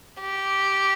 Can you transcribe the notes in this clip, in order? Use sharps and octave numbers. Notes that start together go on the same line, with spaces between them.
G4